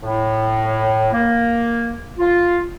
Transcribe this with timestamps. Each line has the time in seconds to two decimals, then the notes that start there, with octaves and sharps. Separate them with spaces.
0.02 A2
1.12 A#3
2.18 F4